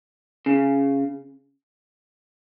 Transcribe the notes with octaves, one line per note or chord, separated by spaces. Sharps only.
C#3